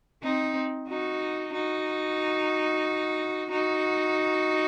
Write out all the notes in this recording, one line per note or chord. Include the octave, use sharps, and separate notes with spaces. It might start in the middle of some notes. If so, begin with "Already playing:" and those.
C4 D#4
D#4 F#4
D#4 F#4
D#4 F#4